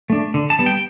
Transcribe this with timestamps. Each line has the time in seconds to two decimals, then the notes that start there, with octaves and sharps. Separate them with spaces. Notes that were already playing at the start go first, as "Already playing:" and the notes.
0.10 A3 D4
0.34 D3
0.50 A5
0.59 G3 B3
0.66 G5